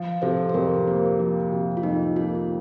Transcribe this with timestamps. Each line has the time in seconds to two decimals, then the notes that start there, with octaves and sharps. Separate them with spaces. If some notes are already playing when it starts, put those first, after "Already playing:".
Already playing: F3
0.22 C3 A4 C5
0.49 C5
0.54 F2 G4 A#4
0.87 A#3
1.19 F3
1.52 C3
1.77 F4
1.83 F2 D#4
2.16 A#3 F4